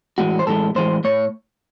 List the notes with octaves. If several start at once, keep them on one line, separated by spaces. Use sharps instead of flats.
A2 E3 G#3 F#4
C5
A2 E3 G#3 A4
A2 E3 G#3 C5
A2 C#5